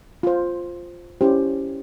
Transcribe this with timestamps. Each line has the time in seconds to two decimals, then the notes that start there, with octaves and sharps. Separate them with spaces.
0.23 F4 C5
1.21 C#4 E4 G4 C5